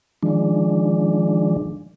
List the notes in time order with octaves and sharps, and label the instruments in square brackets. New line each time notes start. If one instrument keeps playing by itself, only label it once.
[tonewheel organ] D#3 F3 G#3 D4